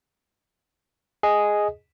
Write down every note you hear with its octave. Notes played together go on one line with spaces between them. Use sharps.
G#4 D#5